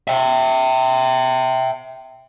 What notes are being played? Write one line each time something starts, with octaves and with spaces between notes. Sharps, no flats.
E5 G5